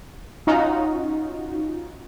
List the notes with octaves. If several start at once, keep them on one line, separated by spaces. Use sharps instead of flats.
C#4 D#4 F4 F#4